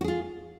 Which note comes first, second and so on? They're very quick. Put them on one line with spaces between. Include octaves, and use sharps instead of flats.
F#4 G#4 F4